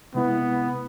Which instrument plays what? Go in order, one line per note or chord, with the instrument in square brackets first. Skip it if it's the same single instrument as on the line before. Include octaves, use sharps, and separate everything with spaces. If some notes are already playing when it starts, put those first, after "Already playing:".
[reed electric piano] C3 G#3 E4 [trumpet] B3